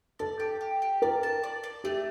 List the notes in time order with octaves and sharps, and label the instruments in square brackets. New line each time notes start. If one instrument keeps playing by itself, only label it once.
[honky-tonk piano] A4 [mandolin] D5
[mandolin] G4
G4
G4
[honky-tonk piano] A#4 [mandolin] D5
[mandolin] A5
D5
D5
[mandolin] A3 [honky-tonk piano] G4